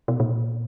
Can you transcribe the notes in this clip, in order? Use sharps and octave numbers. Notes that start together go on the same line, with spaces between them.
B2
A#2